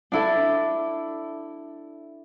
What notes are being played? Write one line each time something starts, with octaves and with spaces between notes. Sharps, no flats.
D4 E4 A4